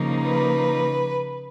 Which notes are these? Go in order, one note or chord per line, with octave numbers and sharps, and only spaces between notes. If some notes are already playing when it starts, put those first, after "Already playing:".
Already playing: C#3 F3 A#3 D#4
B4